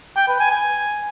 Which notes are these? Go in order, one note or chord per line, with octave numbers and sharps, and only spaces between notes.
G5
B4
G#5
G#5